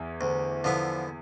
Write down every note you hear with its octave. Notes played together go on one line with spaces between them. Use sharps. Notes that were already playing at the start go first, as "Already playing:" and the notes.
Already playing: E2 E3
D2
D3 F3 B3 E4